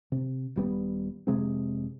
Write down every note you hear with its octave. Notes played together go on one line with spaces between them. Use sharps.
C3
D#1 G3 B3
F1 C3 G#3 C4